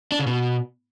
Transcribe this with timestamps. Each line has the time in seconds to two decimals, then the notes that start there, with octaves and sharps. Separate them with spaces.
0.12 D4
0.19 C#3
0.27 B2